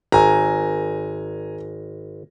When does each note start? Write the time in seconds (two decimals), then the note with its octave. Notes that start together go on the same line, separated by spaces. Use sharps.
0.12 G#1 G#5 A#5